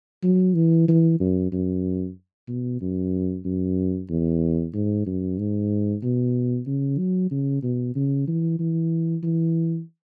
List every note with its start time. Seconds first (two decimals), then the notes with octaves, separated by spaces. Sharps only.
0.23 F#3
0.55 E3
0.88 E3
1.20 F#2
1.52 F#2
2.48 B2
2.81 F#2
3.45 F#2
4.09 E2
4.74 G#2
5.06 F#2
5.38 G#2
6.03 B2
6.67 C#3
6.98 F#3
7.31 C#3
7.63 B2
7.95 C#3
8.28 E3
8.59 E3
9.23 E3